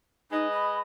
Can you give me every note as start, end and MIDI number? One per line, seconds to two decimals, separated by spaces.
0.31 0.79 56
0.31 0.49 63
0.31 0.79 71
0.31 0.79 75
0.51 0.79 83